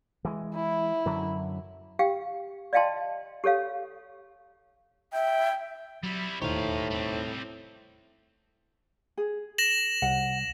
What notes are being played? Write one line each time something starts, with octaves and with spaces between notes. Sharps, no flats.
E3 G#3
E4
F#2 D3 F#3
G4 F5 G5
D5 D#5 F5 G5 A5 C6
G4 A4 C#5 F5
E5 G5
F#3 G3 E4
E1 D#2 A2 D#4 G4 C5 F5 C#6
G3 C4
G#4
A#6 E7 F#7
C2 F#5